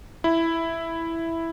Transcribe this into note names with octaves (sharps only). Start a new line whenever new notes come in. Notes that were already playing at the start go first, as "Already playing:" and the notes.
E4